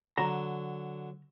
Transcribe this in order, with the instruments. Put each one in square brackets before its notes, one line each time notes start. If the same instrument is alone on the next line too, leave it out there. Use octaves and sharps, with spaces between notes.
[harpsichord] D3 F#3 [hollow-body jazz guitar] A#5